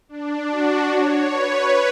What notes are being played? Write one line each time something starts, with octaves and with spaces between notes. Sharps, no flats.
D4
F#4
C#5
B4